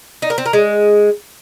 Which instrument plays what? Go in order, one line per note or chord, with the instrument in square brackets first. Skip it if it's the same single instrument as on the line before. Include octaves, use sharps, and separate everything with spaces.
[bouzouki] D#4
A#4
C4
A#4
G#3